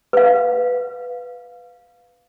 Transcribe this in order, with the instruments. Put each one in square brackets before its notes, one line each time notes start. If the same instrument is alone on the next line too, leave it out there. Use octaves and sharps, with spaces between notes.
[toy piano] B4 F5